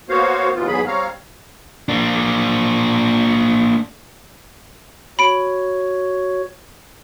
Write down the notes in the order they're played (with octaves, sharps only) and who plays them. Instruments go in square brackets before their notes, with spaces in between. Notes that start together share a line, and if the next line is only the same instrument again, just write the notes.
[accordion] A#3 B3 F#4 C5 C#5 F5
D#2 G#2 E3 B3 F4
E2 G#2 F#3 B3 G#4 B5
G3 C4 C#5 F5 A#5 F6
[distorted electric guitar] A#3 D4
[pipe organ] F#4 C#5 [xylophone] B5 D7